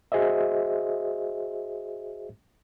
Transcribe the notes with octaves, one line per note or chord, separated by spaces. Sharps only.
F#4 G#4 C5 D#5 E5